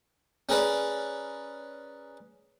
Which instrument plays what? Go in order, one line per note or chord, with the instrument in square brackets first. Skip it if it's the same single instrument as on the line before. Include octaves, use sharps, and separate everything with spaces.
[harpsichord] C#4 G#4 A#4 B4 D5